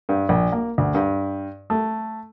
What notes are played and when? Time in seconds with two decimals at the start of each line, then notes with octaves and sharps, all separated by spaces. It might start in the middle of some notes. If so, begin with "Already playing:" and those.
0.09 G2
0.29 A#1
0.52 A#3
0.78 D2
0.94 G2
1.70 A3